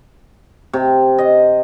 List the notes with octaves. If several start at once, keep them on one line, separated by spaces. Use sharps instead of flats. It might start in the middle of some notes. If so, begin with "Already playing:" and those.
C3
D#5